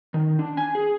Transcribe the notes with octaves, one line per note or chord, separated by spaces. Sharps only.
D#3
D4
G#5
G#4